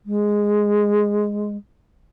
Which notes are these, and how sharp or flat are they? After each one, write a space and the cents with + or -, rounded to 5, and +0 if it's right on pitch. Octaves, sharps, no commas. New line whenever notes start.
G#3 -5